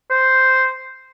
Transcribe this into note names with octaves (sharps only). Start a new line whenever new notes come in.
C5